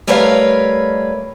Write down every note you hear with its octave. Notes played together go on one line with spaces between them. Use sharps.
G3 A3 A#4 B4 C#5 F5